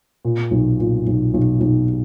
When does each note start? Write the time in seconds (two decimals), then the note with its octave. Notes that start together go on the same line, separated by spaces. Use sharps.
0.25 A#2
0.51 B1
0.79 A#2
1.07 B1
1.34 B1
1.60 B1